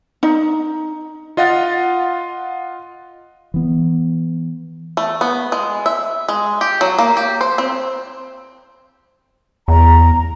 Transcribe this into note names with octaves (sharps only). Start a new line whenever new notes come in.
D#4
F4 D#5 F5 F#5 A6
E3 B3
A3
B3
G#3
E5
G#3
G4
F#3
A#3
G4
C5
C4
E2 A#5